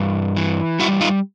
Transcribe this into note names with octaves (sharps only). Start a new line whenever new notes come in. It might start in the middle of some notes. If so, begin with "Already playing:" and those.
Already playing: G2 E3
E3
G3 E4 F#4
D#4 F4